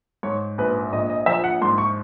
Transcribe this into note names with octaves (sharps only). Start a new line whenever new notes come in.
G#2 C#5
A#1 B4
A#1 D#5
D#5
F3 E5
F#5
G#2 C6
C#6